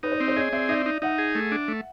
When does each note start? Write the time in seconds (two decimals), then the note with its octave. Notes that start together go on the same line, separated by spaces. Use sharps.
0.03 D#4 B4 C#5
0.12 C5 D5
0.20 C4
0.28 C5 D5
0.36 G#4 C#5 D#5
0.53 C4 D5 E5
0.69 D#4 D5 E5
0.86 D#4
1.02 D#4 E5 F#5
1.18 G#4
1.35 A3
1.52 D4
1.68 A3